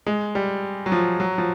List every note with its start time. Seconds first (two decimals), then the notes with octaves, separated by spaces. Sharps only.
0.07 G#3
0.35 G3
0.86 F#3
0.92 F3
1.20 F#3
1.38 F3